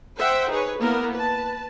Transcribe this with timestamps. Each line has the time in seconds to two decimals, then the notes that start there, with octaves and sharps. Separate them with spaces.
0.17 C5 E5 F#5 G5
0.50 D#4 G#4 B4 C#5
0.79 A#3 B3 E4 A#4
1.14 B4 A5